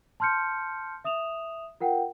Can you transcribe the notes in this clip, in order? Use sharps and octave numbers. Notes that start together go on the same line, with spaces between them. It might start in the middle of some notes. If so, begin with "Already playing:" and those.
A5 C6 F6 G6 C#7
E5 D#6 E7 F7
F4 A#4 F#5 G5